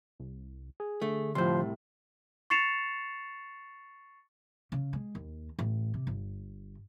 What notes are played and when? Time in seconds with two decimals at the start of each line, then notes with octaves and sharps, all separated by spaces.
0.19 C2
0.80 G#4
1.02 D3 A3
1.35 C2 A2 F3 C5 C6
2.50 C#6 A6 C7 C#7 E7 F7
4.72 C#3
4.93 G#3
5.15 D#2
5.59 A1
5.94 C3
6.07 G1